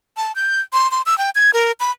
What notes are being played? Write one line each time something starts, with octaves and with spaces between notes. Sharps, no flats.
A5
G6
C6
C6
E6
G5
G#6
A#4
B5